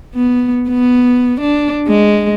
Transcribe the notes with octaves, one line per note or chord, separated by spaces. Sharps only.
B3
B3
D4
G#3